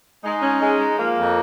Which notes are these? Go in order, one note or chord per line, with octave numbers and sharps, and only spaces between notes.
G#3 D#4
C#4
G#3
G#3
F3 A#3
F2